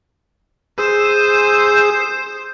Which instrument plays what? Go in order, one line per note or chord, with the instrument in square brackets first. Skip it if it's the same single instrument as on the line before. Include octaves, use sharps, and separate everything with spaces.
[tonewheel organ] G#4 D#6 E6 [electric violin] C5